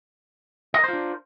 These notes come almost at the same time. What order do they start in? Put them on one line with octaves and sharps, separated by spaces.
D#5 A#4 C5 F4 D4